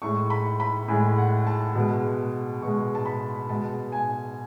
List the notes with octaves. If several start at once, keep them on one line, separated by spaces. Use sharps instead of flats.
A2 G#3 C#6
B5
B5
A2 G#3 G#5
F#5
A5
B2 G#3
B2 G#3 C#6
A5
B5
B2 G#3 A5
G#5